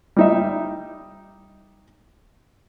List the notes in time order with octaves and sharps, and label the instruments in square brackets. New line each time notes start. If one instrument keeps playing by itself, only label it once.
[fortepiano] G3 D#4 E5